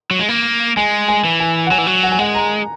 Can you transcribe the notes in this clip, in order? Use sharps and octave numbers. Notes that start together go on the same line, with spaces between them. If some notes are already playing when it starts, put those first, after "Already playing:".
F#3
G#3
A#3
G#3 G#5
G#5
E3
G#5
F#5
F#3 G#5
E3
F#3
F#5
G#5
G#3 F#5
A#5